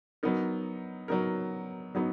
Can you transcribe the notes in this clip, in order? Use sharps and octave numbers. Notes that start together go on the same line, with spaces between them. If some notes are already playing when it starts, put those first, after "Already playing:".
F#3 B3 D#4 A#4
F#3 B3 D#4 A#4
F#3 B3 D#4